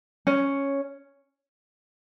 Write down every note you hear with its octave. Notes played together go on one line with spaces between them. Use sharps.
C#4